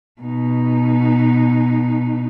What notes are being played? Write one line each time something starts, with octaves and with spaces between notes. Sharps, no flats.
B2 D#4